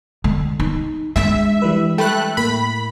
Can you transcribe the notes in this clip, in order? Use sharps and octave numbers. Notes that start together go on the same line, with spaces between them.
D3
D#4
G#3 D4 E5
E3 G3 B4
A3 G5 B5 F#6
A2 A#3 B5